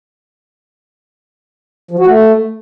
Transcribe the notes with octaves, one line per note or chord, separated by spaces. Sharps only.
F3
F#4
A3